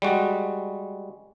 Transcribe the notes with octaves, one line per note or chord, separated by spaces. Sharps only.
G3 G#3 F#4